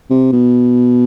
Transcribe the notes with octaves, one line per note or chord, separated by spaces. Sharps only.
C3
B2